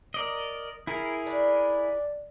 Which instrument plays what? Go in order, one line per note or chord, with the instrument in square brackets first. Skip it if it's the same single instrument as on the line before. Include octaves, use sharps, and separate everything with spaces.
[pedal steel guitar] A#4 D5 D#5
E4 G#4 A#4
[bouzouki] D4